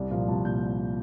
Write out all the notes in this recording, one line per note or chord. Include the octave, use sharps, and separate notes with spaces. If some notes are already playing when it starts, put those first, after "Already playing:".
Already playing: C2 D5
A#2 F3 A#3 F5
C2 A5
A#2 G6